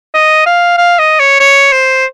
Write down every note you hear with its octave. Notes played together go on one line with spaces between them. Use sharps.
D#5
F5
F5
D#5
C#5
C#5
C5